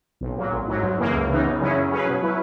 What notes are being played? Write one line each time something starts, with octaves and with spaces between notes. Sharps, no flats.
B1
A#2 F#3
G#1
G#2 F#3
F#2
C#3 E3 A#3
C#2
C#3 E3 B3 D#4
F#2
C#3 F#3 C#4 E4
C#3
F#3 C#4 G#4 B4
B2
F#3 C#4 E4 B4